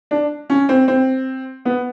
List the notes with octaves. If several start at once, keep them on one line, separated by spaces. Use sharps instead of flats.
D4
C#4
C4
C4
B3